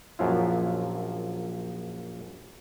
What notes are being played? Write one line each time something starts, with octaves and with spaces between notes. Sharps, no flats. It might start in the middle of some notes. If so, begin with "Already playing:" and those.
A#1 F#2 F3 F#3 E4 F4